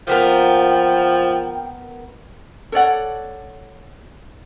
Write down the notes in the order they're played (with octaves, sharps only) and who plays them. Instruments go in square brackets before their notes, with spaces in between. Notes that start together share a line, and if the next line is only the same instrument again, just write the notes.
[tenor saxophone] F3 [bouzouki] A#3 B3 A#4 [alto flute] G5
[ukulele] A4 C#5 D5 F#5